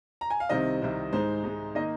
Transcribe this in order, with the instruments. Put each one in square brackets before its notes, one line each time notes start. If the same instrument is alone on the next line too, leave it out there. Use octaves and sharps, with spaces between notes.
[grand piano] A#5
G#5
F5
C2 C3 D#3 C4 D#5
C2 C3 D#3 C4
G#2 G#3 D#4 C5
G#2 G#3 D#4
D#3 A#3 D#4 D#5